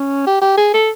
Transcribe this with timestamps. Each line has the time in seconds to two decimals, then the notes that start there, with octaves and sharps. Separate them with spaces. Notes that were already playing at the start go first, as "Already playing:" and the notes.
Already playing: C#4
0.27 G4
0.41 G4
0.58 G#4
0.74 A4